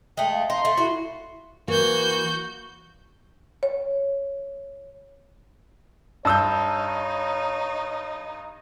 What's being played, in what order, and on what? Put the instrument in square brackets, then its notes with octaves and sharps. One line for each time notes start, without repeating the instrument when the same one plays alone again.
[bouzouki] G#3 A3 [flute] G5
[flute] F5
[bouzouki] D#4 [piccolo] C6
[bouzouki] A3
[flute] E4 [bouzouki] F#4
[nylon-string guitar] E3 A#3 [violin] F#4 G6
[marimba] C#5
[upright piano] G2 E6 G6 [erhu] D#4 [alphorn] C#5 [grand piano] A5